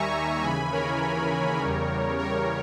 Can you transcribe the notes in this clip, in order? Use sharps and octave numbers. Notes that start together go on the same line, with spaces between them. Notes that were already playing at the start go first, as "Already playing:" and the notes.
Already playing: D#2 D#3 G3 E5 G#5 A#5 C#6
D#2 C#3 E3 G#5 B5
A#4 C#5
E2 C#3 G3
A#4 C#5